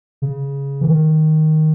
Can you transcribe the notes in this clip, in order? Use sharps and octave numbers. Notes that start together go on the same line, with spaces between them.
C#3
E3
D#3